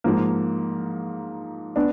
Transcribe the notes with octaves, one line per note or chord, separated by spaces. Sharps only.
G#2 F3 A#3
B3 D4